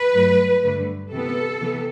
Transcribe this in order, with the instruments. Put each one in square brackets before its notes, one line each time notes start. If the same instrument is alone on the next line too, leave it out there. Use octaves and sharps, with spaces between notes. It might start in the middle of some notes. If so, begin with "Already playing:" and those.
Already playing: [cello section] B4
G2 F#3 A3
G2 D3 A3
C3 E3 B3 A4
C3 E3 B3